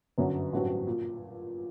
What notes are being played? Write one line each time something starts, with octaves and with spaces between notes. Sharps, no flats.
G1 F#2 D3 F#3
A1 G2 F#3 C4 F#4
A#2